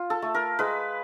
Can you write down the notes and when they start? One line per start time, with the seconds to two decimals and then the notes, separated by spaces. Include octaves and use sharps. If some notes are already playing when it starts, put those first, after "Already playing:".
Already playing: F4
0.10 A4
0.22 A3
0.34 A#4
0.59 G#3 B4